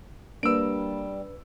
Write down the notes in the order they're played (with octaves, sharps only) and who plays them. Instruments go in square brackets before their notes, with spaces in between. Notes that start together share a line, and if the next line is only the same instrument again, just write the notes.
[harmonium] G3 [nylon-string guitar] A#3 [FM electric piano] D4 B4 [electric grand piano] E6 D7